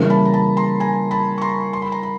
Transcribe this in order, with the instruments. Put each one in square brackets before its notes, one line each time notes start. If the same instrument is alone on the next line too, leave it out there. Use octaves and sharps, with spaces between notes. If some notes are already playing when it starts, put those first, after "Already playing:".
Already playing: [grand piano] C#3 E3 G3 A#3
[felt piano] A5 B5
A#5
A5 B5
A#5 C6
G#5 A#5
A5 B5
C#6
A#5 C6
C6
B5
A#5 C6
B5